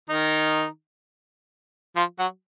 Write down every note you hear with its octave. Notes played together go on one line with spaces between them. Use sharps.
D#3 D#4
F3 F4
F#3 F#4